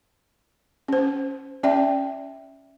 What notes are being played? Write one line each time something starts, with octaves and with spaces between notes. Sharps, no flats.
C#4 C5
C#4 D5 E5 G5